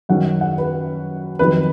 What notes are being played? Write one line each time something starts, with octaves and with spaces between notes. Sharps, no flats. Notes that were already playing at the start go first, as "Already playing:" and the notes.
F#2 D#3 F#3 C#4 F#5
F#5
B4
F2 D#3 F#3 B4